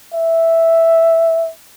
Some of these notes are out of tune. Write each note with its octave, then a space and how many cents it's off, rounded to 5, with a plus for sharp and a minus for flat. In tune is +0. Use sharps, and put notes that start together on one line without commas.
E5 +0